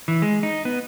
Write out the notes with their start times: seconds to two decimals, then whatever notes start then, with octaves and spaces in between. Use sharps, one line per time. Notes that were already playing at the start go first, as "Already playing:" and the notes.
0.08 E3
0.22 G#3
0.43 D#4
0.65 B3